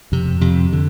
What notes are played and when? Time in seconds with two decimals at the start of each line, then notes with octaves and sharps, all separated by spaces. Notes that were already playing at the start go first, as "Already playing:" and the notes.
0.12 F2 C3
0.41 F2 C3
0.72 D3